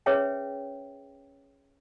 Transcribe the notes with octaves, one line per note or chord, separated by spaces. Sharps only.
C#4 G#4 B4 C#5 E5 G5